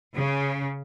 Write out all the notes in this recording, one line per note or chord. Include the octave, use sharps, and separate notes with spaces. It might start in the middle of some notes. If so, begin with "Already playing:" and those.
C#3